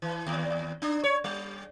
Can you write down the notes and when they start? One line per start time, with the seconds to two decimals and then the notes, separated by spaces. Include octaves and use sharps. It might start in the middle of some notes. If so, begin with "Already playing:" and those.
0.02 E3
0.27 D#2
0.82 D4
1.04 C#5
1.24 G3